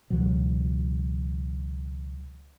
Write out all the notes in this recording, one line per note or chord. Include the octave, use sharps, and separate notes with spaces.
C#2 B2 E3 F#3